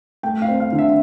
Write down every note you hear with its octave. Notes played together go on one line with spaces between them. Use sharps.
A3 G5
F5
C4
F5
D3
E5